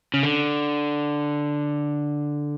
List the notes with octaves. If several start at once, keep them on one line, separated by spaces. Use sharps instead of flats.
C#3
D3